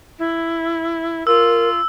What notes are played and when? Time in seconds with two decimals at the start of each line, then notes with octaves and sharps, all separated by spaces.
0.19 E4
1.27 F4 A#4 E6